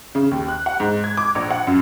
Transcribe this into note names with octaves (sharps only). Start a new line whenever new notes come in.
C#3
D#2
F#6
F#5
G#2
G#6
D6
A#1
F#5
F#2